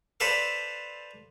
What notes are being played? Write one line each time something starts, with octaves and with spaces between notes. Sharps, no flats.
A4 B4 C5 D5 E5 F5